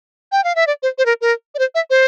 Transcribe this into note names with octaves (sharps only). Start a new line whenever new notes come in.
G5
F5
E5
D5
C5
C5
A#4
A#4
D5
C5
E5
C5